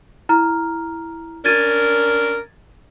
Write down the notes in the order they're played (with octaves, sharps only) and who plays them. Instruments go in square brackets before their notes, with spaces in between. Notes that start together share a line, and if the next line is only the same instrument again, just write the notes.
[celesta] E4 A#5 F6
[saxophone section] C#4 D4 A#4 [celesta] G#6 A6 D#7